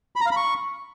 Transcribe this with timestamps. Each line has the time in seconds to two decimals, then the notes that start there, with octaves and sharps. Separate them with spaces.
0.16 B5
0.21 A#5
0.26 F5
0.31 B5
0.36 C#6